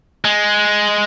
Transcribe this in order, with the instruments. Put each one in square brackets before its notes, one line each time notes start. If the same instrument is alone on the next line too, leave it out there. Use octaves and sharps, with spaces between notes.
[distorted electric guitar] G#3